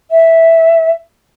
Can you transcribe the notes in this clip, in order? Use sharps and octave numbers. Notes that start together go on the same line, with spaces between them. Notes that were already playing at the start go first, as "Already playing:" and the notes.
E5